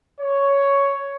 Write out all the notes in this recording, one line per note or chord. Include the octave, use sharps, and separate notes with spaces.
C#5